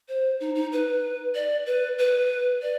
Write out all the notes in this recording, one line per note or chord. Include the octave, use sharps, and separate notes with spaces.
C5
D#4
D#4
B4
D5
B4
B4
D5